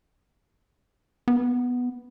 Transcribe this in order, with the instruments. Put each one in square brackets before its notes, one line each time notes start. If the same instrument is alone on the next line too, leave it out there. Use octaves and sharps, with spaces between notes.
[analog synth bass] B3